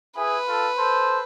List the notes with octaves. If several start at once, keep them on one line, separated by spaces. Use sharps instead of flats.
E4 G#4 B4
F4 A4
A4 C5